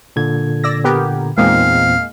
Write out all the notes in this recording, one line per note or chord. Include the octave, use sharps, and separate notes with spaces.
A#2 D3 G#6
D5 E6 A#6
B3 G4 A#4
E2 A#2 G#3 A#3 C4 D#4 F5